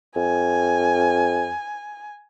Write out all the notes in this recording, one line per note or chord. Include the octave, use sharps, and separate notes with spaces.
F2 G#5